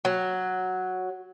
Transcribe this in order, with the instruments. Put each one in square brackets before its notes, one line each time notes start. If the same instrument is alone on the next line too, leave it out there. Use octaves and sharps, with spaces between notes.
[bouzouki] F#3